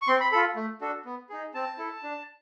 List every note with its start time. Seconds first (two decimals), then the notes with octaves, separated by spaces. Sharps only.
0.02 C#6
0.08 C4 C6
0.20 B5
0.32 F4 A4 B5
0.56 A3
0.81 D4 F#4 A4
1.05 B3
1.29 D#4 G#4
1.54 C4 A5
1.78 E4 A4
2.03 D4